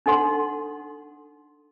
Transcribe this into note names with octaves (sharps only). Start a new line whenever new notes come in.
D4 D#4 A4 F#5 C6